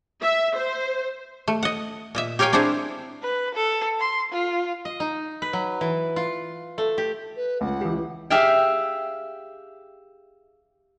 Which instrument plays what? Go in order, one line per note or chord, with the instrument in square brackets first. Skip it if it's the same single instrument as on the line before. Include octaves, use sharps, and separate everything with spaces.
[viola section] E5
C5
[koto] A3
D#5 F#5
A#2 D#5 E5
G4 A#4 C#5 F5 G5 G#5
C4 D4 E4 G#4 C5
[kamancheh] B4
A4
C6
F4
[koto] D#5
D#4
B4
F#3
E3
F4
A3
G4
[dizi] B4
[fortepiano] C#2 [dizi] F#5
[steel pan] E3 G4
[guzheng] G4 G#4 E5 F5 G5